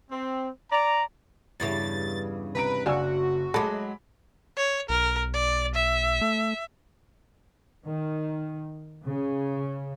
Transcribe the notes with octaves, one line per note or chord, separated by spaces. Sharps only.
C4
D5 A#5
E2 G2 C#3 A6
C3 B4 A#5 D7
F#1 D4 F#4 F5 G#5 E6
F#3 G#3 A4 B5 D6
C#5
B1 A#4
D5
E5
A3
D#3
C#3